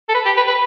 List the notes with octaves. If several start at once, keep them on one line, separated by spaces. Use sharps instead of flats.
A4
B4
G4
B4
B4